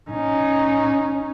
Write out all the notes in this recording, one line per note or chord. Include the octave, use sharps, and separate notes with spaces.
C#4 D#4